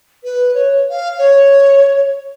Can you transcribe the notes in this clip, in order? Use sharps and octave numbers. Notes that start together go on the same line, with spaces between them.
B4
C#5
F5
C#5